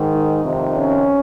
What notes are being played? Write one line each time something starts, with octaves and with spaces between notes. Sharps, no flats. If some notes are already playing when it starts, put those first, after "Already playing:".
Already playing: G#2 D#3
D#4
F2 C3 D#3
C#4